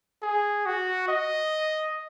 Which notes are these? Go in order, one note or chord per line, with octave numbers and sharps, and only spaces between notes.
G#4
F#4
D#5